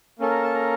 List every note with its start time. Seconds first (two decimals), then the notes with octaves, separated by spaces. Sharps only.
0.19 A#3 C#4 A4
0.30 A#5
0.43 A5
0.54 A#5